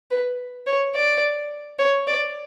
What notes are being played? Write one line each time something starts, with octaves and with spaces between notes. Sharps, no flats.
B4
C#5
D5
C#5
D5